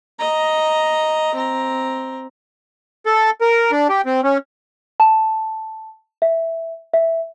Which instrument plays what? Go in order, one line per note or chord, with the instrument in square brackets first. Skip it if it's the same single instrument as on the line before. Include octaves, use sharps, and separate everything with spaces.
[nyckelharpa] D#5 A#5
C4 A#5
[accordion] A4
A#4
D4
G4
C4
C#4
[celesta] A5
E5
E5